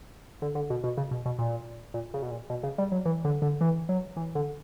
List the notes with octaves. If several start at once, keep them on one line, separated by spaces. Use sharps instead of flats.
D3
D3
B2
B2
C#3
B2
B2
A#2
A#2
C#3
B2
A#2
B2
C#3
G3
F#3
E3
D3
D3
E3
F#3
E3
D3